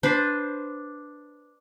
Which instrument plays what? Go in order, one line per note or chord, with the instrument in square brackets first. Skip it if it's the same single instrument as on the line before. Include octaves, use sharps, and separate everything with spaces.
[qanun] D4 B4 C5